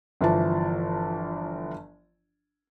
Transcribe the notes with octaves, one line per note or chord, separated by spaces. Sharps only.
G1 E3 F3 A5